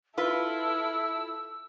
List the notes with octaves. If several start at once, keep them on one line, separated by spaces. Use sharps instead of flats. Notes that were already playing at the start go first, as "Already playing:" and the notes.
E4 F4 A4 B4 E6